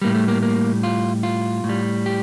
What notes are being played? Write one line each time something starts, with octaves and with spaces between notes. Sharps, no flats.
A2 G3 A#3
A3
A#3
A#3
F4
F4
A2
G3
G4